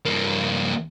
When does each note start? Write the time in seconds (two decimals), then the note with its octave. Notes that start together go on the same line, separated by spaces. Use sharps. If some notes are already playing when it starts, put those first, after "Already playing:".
0.06 G2 A#3